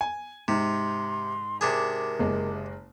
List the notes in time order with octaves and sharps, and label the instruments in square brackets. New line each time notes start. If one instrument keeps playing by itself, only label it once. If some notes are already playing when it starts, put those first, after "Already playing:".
[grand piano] G#5
[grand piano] G#2 [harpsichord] C3 [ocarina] C6
[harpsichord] C3 D4 G#4 [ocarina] A#4
[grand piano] F#1 G#3